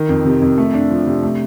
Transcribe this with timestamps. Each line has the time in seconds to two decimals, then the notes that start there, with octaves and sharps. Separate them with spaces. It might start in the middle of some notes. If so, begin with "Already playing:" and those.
Already playing: D#3
0.09 F2
0.25 C3
0.42 F2
0.58 A3
0.74 D4
0.90 F3
1.06 C3
1.23 A3